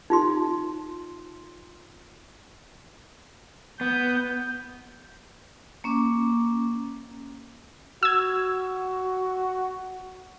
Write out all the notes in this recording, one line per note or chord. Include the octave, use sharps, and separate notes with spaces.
D#4 F4 C6
B3 G6
A#3 C#4 D6
F#4 E6 G#6